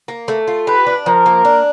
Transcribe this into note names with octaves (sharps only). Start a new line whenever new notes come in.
A#3
A3
F4
G4 B4
D4
F3 A#4
A#3
D4